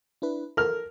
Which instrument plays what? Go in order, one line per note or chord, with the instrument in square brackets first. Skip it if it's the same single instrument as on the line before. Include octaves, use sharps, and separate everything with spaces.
[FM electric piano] D4 E4 B4
[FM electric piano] A4 [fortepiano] A#4 F6